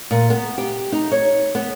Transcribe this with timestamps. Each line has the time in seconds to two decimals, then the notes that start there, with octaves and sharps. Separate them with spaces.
0.11 A#2
0.30 B3
0.58 G4
0.92 D#4
1.12 C#5
1.55 B3